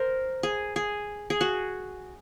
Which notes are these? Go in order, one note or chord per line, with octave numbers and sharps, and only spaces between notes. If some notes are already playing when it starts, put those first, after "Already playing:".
Already playing: A#4 C5
G#4
G#4
G#4
F#4